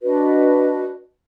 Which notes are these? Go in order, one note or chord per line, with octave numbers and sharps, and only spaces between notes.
D4 F#4 B4 D#5